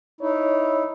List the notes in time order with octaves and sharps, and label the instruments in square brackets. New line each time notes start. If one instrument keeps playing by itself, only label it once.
[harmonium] D#4 E4 [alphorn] C#5